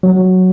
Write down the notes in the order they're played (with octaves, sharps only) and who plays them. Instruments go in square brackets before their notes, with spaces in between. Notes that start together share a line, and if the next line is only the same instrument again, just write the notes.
[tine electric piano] F#3